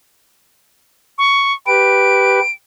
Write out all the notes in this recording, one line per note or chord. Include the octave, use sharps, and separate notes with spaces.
C#6
G4 B4 D7